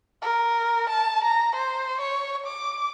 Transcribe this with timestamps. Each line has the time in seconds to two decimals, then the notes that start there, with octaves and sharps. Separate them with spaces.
0.22 A#4
0.90 A5
1.24 A#5
1.56 C5
2.01 C#5
2.46 D6